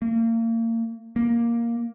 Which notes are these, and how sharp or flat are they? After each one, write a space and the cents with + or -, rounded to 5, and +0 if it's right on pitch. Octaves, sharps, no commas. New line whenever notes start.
A#3 -35
A#3 +5